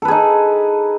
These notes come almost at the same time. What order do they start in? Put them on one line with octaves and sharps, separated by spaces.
A4 B4 G#4 D#4